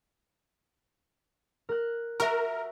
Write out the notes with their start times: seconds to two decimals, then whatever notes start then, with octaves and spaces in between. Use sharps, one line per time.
1.69 A#4 F#6
2.20 F#4 A#4 E5